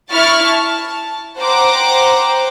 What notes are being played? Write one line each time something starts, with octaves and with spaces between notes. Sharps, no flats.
E4 B5 C#6 F6 A6
A5
C5 F#5 G5 A#5 D6